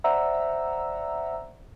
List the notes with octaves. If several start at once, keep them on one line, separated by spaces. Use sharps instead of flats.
C5 D5 E5 F#5 A#5 E6